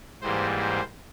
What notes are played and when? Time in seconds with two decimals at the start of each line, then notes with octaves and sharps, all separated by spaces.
0.22 G#2 E3 G3 A#3 C5
0.59 C5